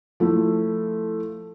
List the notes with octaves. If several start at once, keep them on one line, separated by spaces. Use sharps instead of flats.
F3 A3 E4